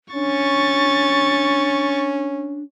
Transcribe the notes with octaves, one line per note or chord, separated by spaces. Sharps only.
C#4 D4 C#6 A6